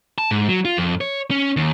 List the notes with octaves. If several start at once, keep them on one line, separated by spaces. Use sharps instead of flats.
A5
G#2
F#3
F4
F2
C#5
C#4
D#2